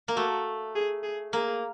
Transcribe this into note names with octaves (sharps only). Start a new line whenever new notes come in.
A#3
A3 F#4
G#4
G#4
A#3 G#4